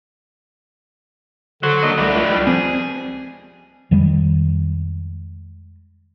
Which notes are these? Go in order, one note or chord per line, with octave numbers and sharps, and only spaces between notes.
D3 F#3 C5
A#3 D4 D#5
C2 E3 A3 D4 F#4
C#2
G3
F3 C4 G#4
F2 D#3 G3 G#3